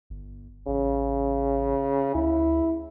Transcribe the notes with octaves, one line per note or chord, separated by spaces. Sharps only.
G1
A1 C#3
D2 E4